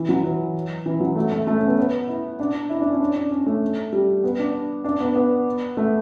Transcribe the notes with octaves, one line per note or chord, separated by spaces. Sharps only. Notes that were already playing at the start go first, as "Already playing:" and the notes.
Already playing: E3
F#3
E3
E3
F#3
A3
A3
A3
C#4
B3
B3
E4
D4
E4
D4
C#4
D4
D4
C#4
A3
G3
B3
D4
D4
B3
B3
A3